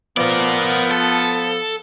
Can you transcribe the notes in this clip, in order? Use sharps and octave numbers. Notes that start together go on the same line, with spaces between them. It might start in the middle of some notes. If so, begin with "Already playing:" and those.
F3 B3 A#4 D5
A4